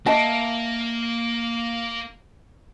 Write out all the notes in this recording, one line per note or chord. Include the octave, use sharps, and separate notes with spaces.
A#3 D#5 E5 A5